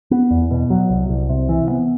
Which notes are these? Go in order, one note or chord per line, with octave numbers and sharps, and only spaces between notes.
B3
E2
B2
F#3
C2
C2
C3
E3
B3